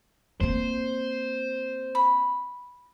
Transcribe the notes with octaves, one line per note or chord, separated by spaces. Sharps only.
A#3 C4 C5
B5